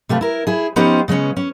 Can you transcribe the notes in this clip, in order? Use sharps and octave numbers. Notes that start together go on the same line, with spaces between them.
C3 A3 F4 B4
E4 A#4
E4 G#4
F3 B3 C#4 D#4 G4 C5
C#3 G#3 B3 C#4
C#4